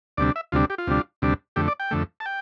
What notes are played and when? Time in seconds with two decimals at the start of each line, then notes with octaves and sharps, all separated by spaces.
0.18 D2 C3 G3 D4 D5
0.36 E5
0.52 D2 C3 G3 D4 F4
0.70 G4
0.78 F4
0.87 D2 C3 G3 D4
1.22 D2 C3 G3 D4
1.56 F2 D3 A3 G4
1.68 D5
1.80 G5
1.91 F2 D3 A3
2.20 A5
2.26 G5